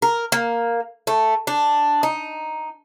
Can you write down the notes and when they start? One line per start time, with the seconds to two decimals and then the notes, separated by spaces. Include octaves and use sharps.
0.02 A#4
0.32 A#3
1.07 A3
1.47 D4
2.03 D#4